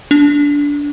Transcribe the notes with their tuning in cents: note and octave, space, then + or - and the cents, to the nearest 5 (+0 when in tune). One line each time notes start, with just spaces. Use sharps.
D4 -20